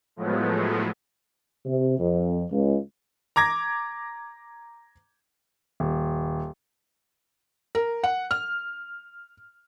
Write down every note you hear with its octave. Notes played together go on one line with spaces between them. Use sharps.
A2 F3 F#3 G#3 A3 B3
C3
F2
C#2
A#5 D6 G#6 A#6
D#1
A#4
F#5
F6